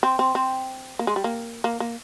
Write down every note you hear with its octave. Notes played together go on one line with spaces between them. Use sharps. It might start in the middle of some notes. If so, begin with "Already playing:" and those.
C4
C4
C4
A#3
G#3
G3
A#3
A#3
A#3